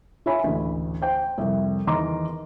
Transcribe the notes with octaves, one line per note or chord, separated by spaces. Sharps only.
F4 C#5 E5 G#5 B5
A1 D2
C5 G5
C2 F2
E2 D#3 A#5 C6 D6